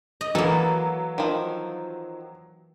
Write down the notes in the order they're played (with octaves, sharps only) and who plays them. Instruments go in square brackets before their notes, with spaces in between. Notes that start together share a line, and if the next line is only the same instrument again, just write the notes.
[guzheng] D#5
[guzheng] E3 A#3 [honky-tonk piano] F#3 [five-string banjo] A4
[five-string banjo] D#3 F3